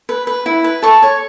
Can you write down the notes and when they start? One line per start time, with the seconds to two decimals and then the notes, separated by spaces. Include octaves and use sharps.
0.09 B4
0.27 B4
0.46 E4
0.64 B4
0.82 A4 C#6
1.02 C#5